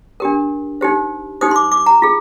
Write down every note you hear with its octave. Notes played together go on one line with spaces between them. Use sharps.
D4 G4 A#4
D#4 G4 C5
D#4 G4 C5 D#6
C6
D6
D6
A#5
F4 G#4